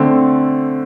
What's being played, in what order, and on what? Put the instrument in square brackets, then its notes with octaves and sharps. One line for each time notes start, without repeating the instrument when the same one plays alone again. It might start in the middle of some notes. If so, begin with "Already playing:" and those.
Already playing: [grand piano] D3 A3 C4